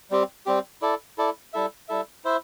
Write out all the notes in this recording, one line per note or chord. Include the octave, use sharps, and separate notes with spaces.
G3 C4 G4
G3 C4 G4
E4 A4 D5
E4 A4 D5
G3 E4 A4 E5
G3 E4 A4 E5
E4 C5 E5